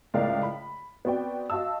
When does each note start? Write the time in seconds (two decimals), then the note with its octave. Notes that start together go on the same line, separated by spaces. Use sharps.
0.14 C#2 A2 A#4 D5 F5
0.43 B5
1.05 B3 C4 F#4 D5 G5
1.50 F#4 D#5 F5 A5 E6